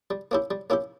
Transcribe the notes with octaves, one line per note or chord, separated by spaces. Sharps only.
G3
A#3 C#4 E4 G4
G3
A#3 C#4 E4 G4